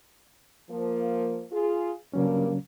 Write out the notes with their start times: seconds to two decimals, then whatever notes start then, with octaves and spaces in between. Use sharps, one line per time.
0.70 F3 A#3
1.52 F4 G#4
2.14 G2 C#3 F#3 A#3 C#4